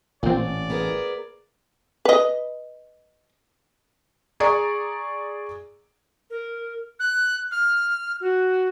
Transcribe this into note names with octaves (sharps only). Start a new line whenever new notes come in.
A1 A#2 C4 D5
B3 G#4 A#4
B4 D#5
G#4 D5 A#5 C#6
A#4
F#6
F6
F#4